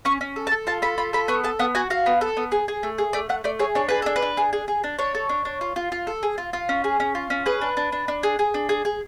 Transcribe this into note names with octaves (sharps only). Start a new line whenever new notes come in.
C#4 C#6
C#4
A4
A5
A4
F4 A5
A4 B5
F4 B5
A4 B5
B3 C#6
A4 A5
B3 F#5
F#4 G#5
F#4 F5
B3
A4
B3
G#4
G#4
A3
G#4
A3 D5
A3 F#5
A3 D5
G#4 C#5
D4 C#5
G#4 B4
D4 A4
B4
D4
G#4
G#4
G#4
D4
D4 C#5
A4
D4
D4
F4
F4
F4
A4
G#4
F4
F4
C#4
G#4
C#4
F4
C#4
G#4 B4
D4
D4
D4
D4
G#4
G#4
D4
G#4
G#4